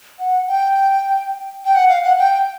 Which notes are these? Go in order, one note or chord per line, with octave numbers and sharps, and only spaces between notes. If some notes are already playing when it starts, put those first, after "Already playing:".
F#5
G5
G5
F#5
F5
F#5
G5